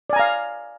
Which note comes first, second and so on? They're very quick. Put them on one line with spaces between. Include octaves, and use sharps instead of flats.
D5 G#5 A#5 F5